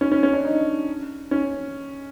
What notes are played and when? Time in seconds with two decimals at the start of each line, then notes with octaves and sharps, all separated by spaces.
0.01 C#4
0.12 C#4
0.23 C#4
0.33 D4
0.44 D#4
1.31 C#4